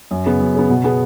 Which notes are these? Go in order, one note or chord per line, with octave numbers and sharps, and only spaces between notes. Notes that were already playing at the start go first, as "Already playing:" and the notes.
F#2
C#3 B3
F#2
C#3 B3
B2
B3 G#4